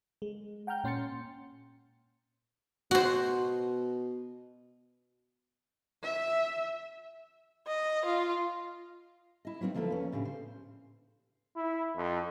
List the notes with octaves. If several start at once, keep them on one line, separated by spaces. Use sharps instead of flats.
G#3
F#5 G5 A#5 F6 G6
A#2 C#4 C6 G6 A6 C#7
B2 F#4 C5
E5
D#5
F4
E4 D#5
F#3 A#3 C4 C#4 D#4
D2 F3 A#3 E4 A4 B4
E2 C#4
A2 C#3 D4 G4
C5
E4
F2